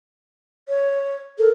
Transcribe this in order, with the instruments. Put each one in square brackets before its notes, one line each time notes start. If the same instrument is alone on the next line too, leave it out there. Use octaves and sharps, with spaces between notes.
[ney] C#5
[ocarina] A4 [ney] A#4